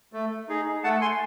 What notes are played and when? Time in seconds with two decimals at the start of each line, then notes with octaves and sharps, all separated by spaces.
0.13 A3
0.49 D#4 G#4
0.84 A3 F#5 A5
1.01 G#5 C6